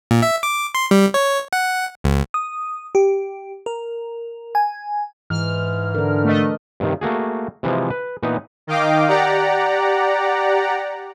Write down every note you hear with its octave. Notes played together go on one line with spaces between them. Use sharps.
A#2
E5
D6
C6
G3
C#5
F#5
C#2
D#6
G4
A#4
G#5
G#2 E3 F6
D3 D4 A#4
A3 D#5
G2 C3 D#3
A3 A#3 F#4 G#4
C3 E3 F3 G#3
B4
A#2 E3 B3 D#4 B4
D#3 D#5 F5 G5 D6
G4 D5 F#5 A#5